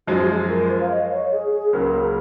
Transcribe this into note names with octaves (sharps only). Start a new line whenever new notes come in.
F#2 F3 G#3 F#4
F#4
G#4
A#4
C5
F5
D#5
C#5
G#4
G#4
C#2 C#3 F#3 A#3 A#4
G#4